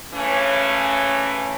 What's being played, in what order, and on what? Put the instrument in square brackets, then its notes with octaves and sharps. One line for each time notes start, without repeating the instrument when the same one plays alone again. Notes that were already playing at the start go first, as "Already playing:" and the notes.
[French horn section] C#3 E3 A3 C#4